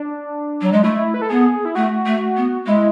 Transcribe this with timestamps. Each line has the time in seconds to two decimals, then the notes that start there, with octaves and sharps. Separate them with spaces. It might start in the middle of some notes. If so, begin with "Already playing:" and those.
Already playing: D4
0.61 F#3
0.72 G#3
0.83 A3 E4
1.14 B4
1.22 A4
1.30 B3 G#4
1.65 E4
1.75 A3 F#4
2.06 A3
2.37 B3
2.66 G#3 E4